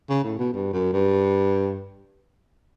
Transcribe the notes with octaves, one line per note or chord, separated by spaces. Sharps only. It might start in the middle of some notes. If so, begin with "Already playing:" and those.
C#3
A2
B2
G2
F#2
G2